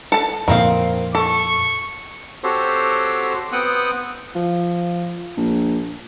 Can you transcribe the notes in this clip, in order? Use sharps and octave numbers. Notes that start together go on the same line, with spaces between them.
A4 A5
F2 A#2 D#3 C4 F5
A4 C#6
C4 F#4 G4 A4 C5 C#5
B3 C4 F#5 G5 D#6 F#6
F3
A#1